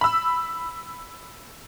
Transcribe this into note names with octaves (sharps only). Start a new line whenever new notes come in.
B5 E6